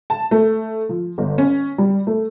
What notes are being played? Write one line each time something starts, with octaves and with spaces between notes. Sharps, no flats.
A5
A3
F3
G1
C#4
G3
A3